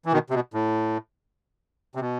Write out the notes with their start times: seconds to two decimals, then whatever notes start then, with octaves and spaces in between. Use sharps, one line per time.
0.06 E3
0.12 B2 D#3
0.30 C3
0.34 B2
0.54 A2
1.95 C3
2.00 B2